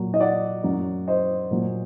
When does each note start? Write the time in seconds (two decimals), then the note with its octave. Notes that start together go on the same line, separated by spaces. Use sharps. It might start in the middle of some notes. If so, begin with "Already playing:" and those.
Already playing: A#2 F#3
0.14 D#5
0.20 D5 F#5
0.63 F#2 F#3
1.08 C5 D#5
1.51 A#2 F#3